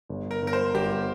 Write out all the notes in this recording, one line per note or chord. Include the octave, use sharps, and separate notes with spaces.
G1
A#4
G1 A#4
C5
G1 G4